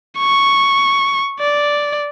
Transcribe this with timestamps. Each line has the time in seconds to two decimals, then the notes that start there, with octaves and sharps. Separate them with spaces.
0.19 C#6
1.40 D5